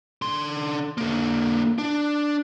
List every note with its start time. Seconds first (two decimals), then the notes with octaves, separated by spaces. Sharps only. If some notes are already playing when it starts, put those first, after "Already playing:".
0.22 D3 C6
0.98 D3 A#3
1.78 D4